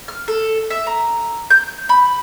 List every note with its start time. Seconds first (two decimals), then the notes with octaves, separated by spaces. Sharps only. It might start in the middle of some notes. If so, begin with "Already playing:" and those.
0.08 F6
0.28 A4
0.70 E5
0.87 A#5
1.50 G6
1.89 B5